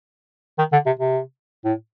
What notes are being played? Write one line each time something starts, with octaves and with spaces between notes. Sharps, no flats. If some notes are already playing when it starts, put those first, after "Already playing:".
D#3
D3
C3
C3
A2